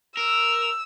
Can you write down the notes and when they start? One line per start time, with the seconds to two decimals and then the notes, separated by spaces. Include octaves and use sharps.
0.17 A#4 E6